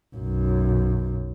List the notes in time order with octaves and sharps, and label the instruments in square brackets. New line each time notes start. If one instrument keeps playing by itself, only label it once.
[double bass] B1 F#2